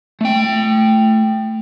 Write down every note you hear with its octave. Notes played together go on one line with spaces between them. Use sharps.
A3 G5